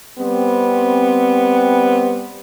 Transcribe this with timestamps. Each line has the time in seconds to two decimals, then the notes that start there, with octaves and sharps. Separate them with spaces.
0.19 G3 B3 C4